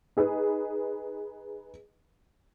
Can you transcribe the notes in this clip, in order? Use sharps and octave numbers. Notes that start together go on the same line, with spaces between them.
D#4 G#4 B4